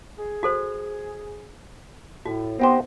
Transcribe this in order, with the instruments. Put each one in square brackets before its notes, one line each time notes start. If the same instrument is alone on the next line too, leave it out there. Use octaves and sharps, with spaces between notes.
[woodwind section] G#4
[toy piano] F#4 A4 C5
[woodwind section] A2 [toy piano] F#4
[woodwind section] D#3 D#5 [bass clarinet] B3 [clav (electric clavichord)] C4 G4 C5